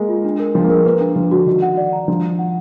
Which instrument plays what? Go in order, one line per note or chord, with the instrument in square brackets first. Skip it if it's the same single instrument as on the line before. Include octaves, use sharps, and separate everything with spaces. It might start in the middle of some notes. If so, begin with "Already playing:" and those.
Already playing: [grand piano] G#3 A#3
[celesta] F4
D4
A#4
[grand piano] F3 [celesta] D4
[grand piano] A#3
[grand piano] G#3 [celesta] A#4
[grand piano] A#3 [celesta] B4
[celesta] D4
[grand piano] F3 [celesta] D4
[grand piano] D3 [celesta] F#4
[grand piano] D#3 [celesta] F#4
[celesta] F#5
D5
A#5
[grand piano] F3 [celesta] D4
[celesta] F#5
F#5